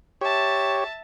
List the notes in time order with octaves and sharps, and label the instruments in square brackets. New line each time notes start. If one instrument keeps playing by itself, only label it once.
[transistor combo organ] G4 C#5 [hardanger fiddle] E5 A5